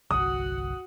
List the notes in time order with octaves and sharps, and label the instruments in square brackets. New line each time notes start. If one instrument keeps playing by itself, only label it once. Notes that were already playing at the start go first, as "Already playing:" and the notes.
[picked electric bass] G1 C2 F#3 [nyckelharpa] F#4 F#5 [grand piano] D#6